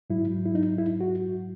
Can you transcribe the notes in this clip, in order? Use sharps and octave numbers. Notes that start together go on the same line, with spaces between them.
G#2 F#3 E4
E4
D#4
E4
F#4